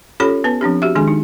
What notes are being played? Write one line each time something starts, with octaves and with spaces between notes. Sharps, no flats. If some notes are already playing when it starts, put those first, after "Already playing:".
C#4 F4 G4 A4 C#5 B5
B3 B4 A5
F3 C4 D4 G4
F#4 G4 E5
D#3 G#3 D4 G#4 G#5
D#4